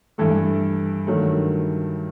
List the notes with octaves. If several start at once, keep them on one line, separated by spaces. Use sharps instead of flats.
G2 E3 A3 A4
G2 D#3 F#3 A3